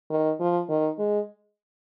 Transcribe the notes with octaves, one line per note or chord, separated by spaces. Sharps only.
D#3
F3
D#3
G#3